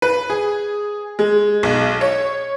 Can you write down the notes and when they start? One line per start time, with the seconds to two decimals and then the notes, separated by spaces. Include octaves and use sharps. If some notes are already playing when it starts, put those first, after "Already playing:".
0.02 B4
0.30 G#4
1.19 G#3
1.63 B1
2.01 C#5